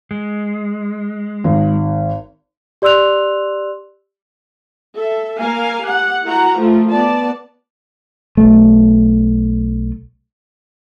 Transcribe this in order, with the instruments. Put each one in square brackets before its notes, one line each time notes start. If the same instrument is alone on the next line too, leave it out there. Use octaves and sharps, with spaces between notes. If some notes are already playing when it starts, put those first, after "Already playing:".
[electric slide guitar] G#3
[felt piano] G#1
[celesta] G4 D5 C6 E6 F#6 F7
[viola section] A4 E5
A#3 A#4 F5 G#5
G4 F#5
E4 F#4 A#4 F#5 A#5
F3 A3 F4 A#4
B3 D5 A5
[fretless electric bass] B1 A3